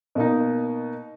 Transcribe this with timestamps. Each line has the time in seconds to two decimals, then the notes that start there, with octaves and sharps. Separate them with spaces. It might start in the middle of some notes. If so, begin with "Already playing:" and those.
0.15 B2 A#3 D#4